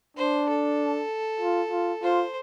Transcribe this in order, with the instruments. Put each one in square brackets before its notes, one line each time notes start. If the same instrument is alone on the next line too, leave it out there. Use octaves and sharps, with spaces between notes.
[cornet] D4 [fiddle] C5
[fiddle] A4
[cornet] F4
F4
[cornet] F4 [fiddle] C5